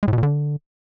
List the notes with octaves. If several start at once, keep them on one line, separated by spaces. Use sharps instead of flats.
G#3
A2
B2
A#2
D3